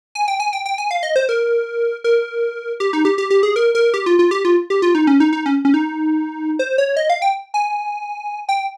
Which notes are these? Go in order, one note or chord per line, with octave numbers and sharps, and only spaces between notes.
G#5
G5
G#5
G5
G5
G#5
F5
D#5
C5
A#4
A#4
G4
D#4
G4
G4
G4
G#4
A#4
A#4
G4
F4
F4
G4
F4
G4
F4
D#4
C#4
D#4
D#4
C#4
C#4
D#4
C5
C#5
D#5
F5
G5
G#5
G5